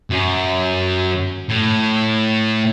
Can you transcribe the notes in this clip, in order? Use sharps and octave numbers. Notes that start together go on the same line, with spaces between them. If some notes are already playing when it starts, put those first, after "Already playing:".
F#2
A2